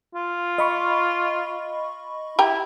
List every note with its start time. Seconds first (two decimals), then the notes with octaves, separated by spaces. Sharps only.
0.15 F4
0.58 D#5 B5 C#6
2.39 E4 G4 G5 A#5